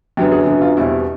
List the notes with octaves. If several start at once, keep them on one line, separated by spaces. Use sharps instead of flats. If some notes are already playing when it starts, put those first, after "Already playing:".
F#2 D3 F#3 B3 G4
G#4
F#2 D3 F#3 B3
F4
E2 B2 G3 C4 E4